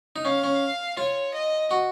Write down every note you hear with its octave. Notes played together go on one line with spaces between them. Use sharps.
D#4
C#4 F5
C#4
F4 C#5
D#5
F#4